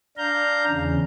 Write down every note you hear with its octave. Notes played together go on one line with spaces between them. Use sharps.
D4 F5 A#5 G6
E2 C#3